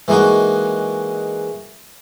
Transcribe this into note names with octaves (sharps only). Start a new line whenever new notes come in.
E3 G#3 A#3 D#4 F#4